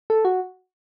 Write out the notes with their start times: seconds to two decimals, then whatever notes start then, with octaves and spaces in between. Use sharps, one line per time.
0.10 A4
0.25 F#4